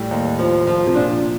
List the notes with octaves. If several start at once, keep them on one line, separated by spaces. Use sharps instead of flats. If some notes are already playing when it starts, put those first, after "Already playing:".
Already playing: A2 G3
D#2
F3
F3
C3
A#2 D4